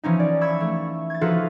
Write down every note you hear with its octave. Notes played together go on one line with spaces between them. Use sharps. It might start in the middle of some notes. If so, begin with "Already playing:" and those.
E3 F3 C#4 D#4
D5
B5 C#6 E6 G#6
A3
G#6 A6
F3 D#4 F4 F#4 A4 B4